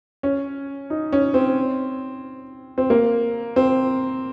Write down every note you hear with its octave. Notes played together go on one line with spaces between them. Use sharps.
C#4
D#4
C#4
C4
C4
A#3
C4